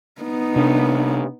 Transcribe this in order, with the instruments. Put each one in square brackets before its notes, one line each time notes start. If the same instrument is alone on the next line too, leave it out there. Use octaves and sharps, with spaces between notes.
[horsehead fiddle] B3 D#4
[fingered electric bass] C3 D4